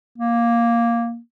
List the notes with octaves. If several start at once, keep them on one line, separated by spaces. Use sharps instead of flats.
A#3